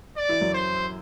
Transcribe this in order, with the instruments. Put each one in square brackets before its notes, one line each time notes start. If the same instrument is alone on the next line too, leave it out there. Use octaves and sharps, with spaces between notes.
[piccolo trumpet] D5
[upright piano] E3 E4
F#2 F#3
[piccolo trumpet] C5